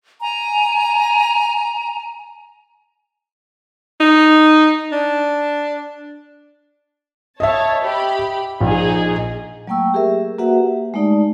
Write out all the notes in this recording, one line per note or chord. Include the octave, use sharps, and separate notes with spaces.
G#5 A#5
D#4
D4
C#5 D#5 E5 A5
G4 B5
A#1 D#4 G#4
F#3 A3 A#3 G5 C#6 E6
G4 G#4 A#4 E5
A#3 F#4 G#4 B4 E5 F#5
G4
G#3 A3 D#4 D5